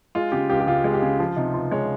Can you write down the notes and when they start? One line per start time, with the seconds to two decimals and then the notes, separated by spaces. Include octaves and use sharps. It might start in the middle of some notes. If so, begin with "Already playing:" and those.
0.15 G#3 F4
0.32 C#3 G4
0.50 C#2 G4
0.60 G4
0.67 C#2 F4
0.84 G#3
0.94 G4
1.02 C#3
1.19 F3 F4
1.36 C3 D#4
1.54 C#2 F4
1.71 G#3 C#5